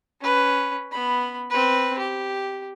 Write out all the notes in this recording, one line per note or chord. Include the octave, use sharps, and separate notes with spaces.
C#4 B4
B3 B5
C4 B4
G4